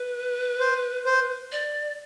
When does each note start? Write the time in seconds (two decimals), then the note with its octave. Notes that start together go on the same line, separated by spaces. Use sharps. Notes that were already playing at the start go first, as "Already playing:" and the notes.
Already playing: B4
0.60 C5
1.06 C5
1.52 D5